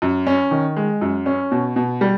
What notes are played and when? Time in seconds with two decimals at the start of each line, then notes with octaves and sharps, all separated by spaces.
0.02 F#2
0.27 C#4
0.51 D#3
0.76 G#3
1.01 F#2
1.26 C#4
1.52 B2
1.76 B2
2.01 G3